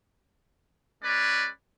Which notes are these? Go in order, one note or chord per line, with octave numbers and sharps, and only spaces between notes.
G#3 C#4 B4 D5